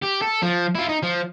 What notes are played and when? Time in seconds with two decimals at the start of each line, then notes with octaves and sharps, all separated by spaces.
0.02 G4
0.22 A4
0.42 F3
0.75 E4 F4
0.89 D#4
1.03 F3